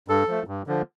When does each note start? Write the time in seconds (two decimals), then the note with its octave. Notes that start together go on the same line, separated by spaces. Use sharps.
0.08 G2 A4
0.28 F3 A3
0.47 G2
0.67 D3 F3